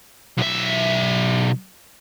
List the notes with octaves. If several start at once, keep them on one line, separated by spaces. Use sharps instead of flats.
B1 E5